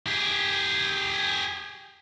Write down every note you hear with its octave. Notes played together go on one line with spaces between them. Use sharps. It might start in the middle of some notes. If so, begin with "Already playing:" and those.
G4 G#4